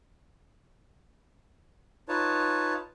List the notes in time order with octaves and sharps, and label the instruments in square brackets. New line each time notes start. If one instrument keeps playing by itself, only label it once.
[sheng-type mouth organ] D#4 F4 B4 C#5 A5